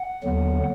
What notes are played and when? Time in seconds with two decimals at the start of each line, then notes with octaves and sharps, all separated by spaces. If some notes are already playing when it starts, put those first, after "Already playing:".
Already playing: F#5
0.23 D#2 D3 F#3 B3